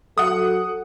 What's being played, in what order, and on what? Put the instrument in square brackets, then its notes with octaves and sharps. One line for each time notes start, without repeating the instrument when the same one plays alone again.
[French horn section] F#3 F#4 A4 [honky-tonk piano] F#5 D#6